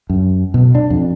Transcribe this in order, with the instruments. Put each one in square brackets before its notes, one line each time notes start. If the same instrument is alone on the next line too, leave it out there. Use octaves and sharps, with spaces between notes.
[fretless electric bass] F#2
B2
D4
F2